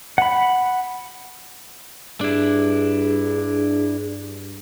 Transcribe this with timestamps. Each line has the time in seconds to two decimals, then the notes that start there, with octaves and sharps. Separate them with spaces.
0.18 F#5 B5
2.21 G2 D4 E4 G#4